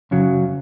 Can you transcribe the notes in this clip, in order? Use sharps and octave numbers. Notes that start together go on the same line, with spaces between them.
F#2 C#3 F#3